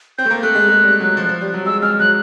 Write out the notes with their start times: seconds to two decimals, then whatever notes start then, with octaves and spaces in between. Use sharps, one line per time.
0.18 C4 G6
0.25 A3
0.31 A#3
0.43 A3 F#6
0.55 G#3
0.68 G#3
0.84 G3
1.00 F#3
1.17 F3
1.29 F3
1.41 G3
1.54 F#3
1.66 G#3 E6
1.82 G#3 F6
1.99 F#3 F#6